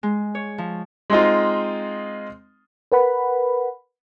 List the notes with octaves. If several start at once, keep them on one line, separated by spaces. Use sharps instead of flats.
G#3
C#5
F3
G#3 C4 D#4 F4
A#4 B4 F#5 B5